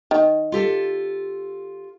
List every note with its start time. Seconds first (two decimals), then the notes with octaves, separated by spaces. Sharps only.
0.11 D#3
0.52 F4 G4 A4